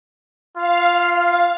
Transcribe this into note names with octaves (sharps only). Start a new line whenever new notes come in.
F4 F5